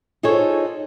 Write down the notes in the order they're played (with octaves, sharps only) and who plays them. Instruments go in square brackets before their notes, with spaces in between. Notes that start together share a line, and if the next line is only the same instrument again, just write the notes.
[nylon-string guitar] D#4 F4 G#4 A4 C5 C#5